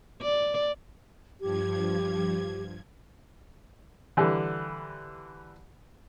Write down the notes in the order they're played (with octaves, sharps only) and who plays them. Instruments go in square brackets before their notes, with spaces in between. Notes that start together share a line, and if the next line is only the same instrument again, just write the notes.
[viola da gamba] D5
[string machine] G2 F3 G#6 [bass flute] G4
[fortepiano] D3 E3 G3